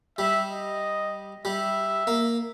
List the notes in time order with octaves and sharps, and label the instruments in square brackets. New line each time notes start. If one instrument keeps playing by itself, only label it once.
[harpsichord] G3 [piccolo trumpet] E5
[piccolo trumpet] D#5
[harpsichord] G3 [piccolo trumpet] E5
[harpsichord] A#3